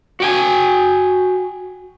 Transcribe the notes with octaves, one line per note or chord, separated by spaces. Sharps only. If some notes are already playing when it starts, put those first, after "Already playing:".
F#4 G5 G#5